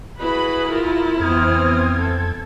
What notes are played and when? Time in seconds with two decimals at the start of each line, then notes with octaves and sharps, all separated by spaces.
0.20 E4 F#4 G#4 B4 B5
0.73 F4 A#4
1.20 F2 E3 B3 C4 D#6 F6 G#6
1.99 A4